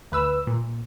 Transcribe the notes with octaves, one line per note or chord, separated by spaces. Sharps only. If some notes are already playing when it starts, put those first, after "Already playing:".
D2 B4 E6
A#2